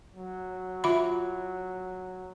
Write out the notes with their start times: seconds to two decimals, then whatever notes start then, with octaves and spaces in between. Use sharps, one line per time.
0.14 F#3
0.84 F4 E5 B5